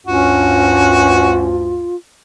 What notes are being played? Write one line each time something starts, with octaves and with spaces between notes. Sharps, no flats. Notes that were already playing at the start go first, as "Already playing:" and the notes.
D2 G2 C#4 F4 F#4